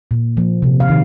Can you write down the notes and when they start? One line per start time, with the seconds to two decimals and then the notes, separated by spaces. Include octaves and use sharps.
0.11 A#2
0.37 F3 A#3
0.62 C3
0.80 F5
0.89 D#3